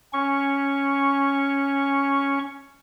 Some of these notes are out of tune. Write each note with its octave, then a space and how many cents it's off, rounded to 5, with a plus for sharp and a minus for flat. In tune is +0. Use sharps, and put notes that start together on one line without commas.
C#4 +0 C#6 +0